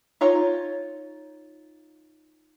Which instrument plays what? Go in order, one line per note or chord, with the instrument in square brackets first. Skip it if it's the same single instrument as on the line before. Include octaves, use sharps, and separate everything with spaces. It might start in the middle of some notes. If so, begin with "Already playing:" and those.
[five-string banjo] D#4 F4 C#5 A#5